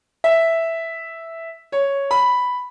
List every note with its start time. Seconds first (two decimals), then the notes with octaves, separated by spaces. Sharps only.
0.24 E5
1.72 C#5
2.11 B5